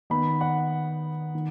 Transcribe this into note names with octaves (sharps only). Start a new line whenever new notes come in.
D#3 B3 D#4 B5
F#5
D#3